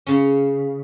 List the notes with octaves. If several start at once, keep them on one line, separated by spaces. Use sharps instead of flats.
C#3 C#4